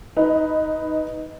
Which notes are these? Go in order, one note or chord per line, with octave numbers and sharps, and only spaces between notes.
D#4 B4